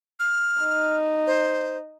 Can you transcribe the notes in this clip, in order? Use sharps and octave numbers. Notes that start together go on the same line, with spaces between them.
F6
D#4
C5